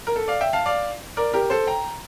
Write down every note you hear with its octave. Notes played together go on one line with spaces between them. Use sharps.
A#4
A4
D5 F5
E5 G5
F5 A5
D5 F5
A#4 D5
G4 A#4
A4 C5
G5 A#5